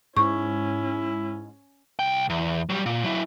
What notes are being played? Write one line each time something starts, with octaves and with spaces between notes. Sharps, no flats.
G#2 C#4 E4 C#6
C2 G5
E2
F#3 G3
A#2
F#3 E4